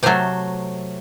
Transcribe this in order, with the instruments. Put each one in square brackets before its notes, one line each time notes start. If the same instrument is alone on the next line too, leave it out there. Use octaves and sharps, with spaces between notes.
[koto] C3 F#3 A3 C5